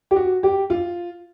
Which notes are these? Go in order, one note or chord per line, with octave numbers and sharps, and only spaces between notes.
G4
F#4
G4
F4